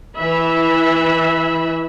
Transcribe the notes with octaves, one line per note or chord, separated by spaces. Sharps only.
E3 E5 B5